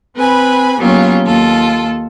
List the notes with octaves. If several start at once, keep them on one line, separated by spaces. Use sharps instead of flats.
C4 B4 G#5 B5
F#3 G3 A#3 B3 C#4 F4
D#2 F4 A4